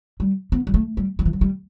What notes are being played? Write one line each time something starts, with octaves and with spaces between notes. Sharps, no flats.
G3
B3
G3
A3
G3
F#3
E3
F#3
G3